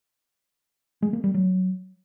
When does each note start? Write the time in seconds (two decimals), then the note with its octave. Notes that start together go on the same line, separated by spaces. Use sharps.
1.02 G#3
1.13 A#3
1.24 G3
1.34 F#3